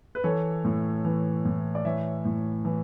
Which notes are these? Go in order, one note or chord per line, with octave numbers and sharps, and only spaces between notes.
B4
E3 A4 C#5
A2
E3
A2
D5
E3 C#5 E5
A2
E3